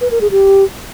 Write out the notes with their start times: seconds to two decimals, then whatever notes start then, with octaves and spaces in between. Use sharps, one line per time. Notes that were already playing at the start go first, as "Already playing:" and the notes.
0.01 B4
0.11 A#4
0.21 G#4
0.31 G4